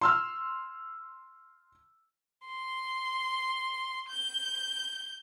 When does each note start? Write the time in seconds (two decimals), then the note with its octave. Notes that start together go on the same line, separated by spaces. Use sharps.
0.01 C6 E6 F6
2.48 C6
4.09 G6